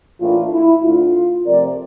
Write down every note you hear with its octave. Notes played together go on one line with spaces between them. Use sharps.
A2 E3 A#3 D4 F4
E4
D2 D3 A3 F4
C3 F3 A3 C4 A#4 D5